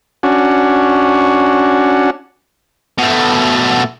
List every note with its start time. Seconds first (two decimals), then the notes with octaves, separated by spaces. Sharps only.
0.23 C#4 D4 F#4
2.98 B2 A3